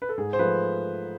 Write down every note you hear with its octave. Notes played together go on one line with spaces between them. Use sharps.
B4
A4
G#2 G#4
C5
F3 A3 B4